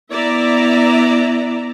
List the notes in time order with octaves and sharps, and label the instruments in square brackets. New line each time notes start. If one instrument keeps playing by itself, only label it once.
[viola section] B3 E4 D5 E5 A#5